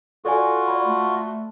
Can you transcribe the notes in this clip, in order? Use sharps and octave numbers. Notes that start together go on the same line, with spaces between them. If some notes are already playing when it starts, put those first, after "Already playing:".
F4 F#4 A4 D5 G#5
D5 B5
A3